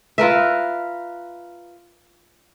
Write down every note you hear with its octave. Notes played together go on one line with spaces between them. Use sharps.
F4 A#4 B4 E5